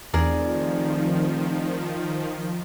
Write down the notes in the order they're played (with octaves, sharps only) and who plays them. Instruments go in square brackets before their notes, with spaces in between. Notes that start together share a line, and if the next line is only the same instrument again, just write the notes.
[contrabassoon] F1 [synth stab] E2 [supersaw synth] D#3 F3 [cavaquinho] G#4 A#4 D5